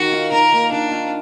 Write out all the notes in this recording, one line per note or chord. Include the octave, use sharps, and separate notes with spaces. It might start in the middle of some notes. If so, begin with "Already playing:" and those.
Already playing: D#3 F#4
F4
D#3 A#4
A#3
D#3 D4
F4